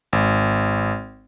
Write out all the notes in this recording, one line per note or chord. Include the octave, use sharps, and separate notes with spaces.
G#1